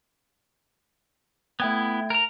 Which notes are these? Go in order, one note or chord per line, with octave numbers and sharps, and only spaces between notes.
A3 B3 E4 G5 G#6
A#4 A#5